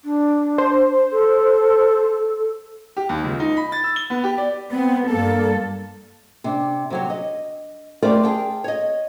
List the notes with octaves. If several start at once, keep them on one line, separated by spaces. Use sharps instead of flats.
D4
C5
A4
G4
D#2
C#2
D#4
B5
A6
E6
G7
B3
G4
D5
B3 C4
G2 A#3 A4
C3 D4
C3 F#3 C#5
D#5
A3 F4 G4 A#4 C5 D5
G#4 G5 A5
C#5 D#5